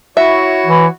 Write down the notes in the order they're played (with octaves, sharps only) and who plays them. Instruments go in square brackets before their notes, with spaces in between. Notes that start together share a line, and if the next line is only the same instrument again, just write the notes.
[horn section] E4 F#4 C#5 [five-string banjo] E5
[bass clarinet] E3